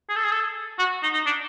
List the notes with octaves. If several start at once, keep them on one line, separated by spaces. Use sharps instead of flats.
G#4
A4
G#4
A4
F#4
D#4
D#4
D4